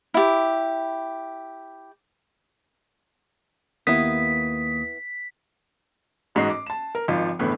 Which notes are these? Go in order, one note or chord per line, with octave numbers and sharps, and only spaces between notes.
E4 G4
D#2 A#3 B3 E4 D#6 B6
A1 G#2 F#4 D#5 C7
D6
A5 E7
A#4
G#1 F3 D#4 F4
G1 E2 A2 B3 B4